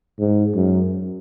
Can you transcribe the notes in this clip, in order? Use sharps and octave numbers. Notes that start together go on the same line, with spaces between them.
G#2
F#2